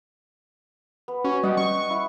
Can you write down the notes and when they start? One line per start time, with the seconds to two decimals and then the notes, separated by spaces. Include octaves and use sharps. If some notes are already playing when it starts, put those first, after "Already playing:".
1.08 B3
1.24 C#4 F#4
1.43 G3 D#5 F#5
1.57 C#6
1.90 E4